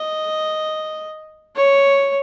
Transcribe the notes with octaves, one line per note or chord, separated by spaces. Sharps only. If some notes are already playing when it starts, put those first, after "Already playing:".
Already playing: D#5
C#5